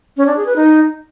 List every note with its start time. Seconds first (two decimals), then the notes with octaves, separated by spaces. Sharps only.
0.17 C#4
0.27 D4
0.36 G#4
0.46 B4
0.56 D#4